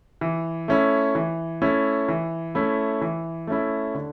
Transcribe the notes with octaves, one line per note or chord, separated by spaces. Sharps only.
E3
A3 C#4 E4
E3
A3 C#4 E4
E3
A3 C#4 E4
E3
A3 C#4 E4
D3